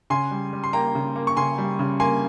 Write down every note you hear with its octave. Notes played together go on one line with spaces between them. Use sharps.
C#3 G#5 C6
G3
G3
C6
A#3 G5 A#5
C#3
A#3
C#6
C#3 G#5 C6
G3
C#3
A#3 G#5 C6